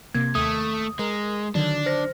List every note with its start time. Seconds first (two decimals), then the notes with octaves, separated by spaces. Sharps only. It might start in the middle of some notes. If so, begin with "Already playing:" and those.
0.15 C3 A#3 G#6
0.35 D#2 A3 D#6 D#7
0.99 G#3 A#4
1.55 D3 D#3 F#3 D4
1.86 C5 A#6